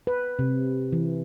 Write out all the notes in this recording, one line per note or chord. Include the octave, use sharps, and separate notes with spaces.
B4
C3
E3